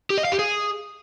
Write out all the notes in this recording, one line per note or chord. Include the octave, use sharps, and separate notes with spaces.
G4
D#5
F5
G4
G#4